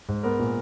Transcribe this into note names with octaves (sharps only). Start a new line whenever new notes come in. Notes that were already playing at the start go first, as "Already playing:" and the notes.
G#2
B3 A#4
A#2